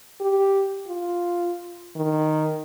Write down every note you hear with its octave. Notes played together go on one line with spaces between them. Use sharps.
G4
F4
D#3